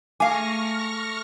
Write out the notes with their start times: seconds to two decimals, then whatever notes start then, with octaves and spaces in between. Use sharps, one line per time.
0.20 A3 F5 G#5 C#6 D6 F6 A#6